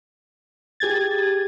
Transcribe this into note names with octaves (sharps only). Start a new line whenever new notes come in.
G4 G#4 G#6 A6